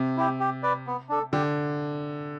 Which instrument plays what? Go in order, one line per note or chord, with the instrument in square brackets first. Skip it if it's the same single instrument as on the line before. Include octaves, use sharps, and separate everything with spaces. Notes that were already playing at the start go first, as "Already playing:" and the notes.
Already playing: [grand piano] C3
[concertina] E4 G4
G4
B4 D5
B3
D4 A4
[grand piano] D3 [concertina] G4